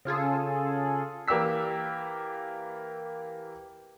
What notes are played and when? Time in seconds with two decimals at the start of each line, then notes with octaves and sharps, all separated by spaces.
0.05 C#3 F4 G#4 A4
1.28 E3 A#3 G4 D5 E6 B6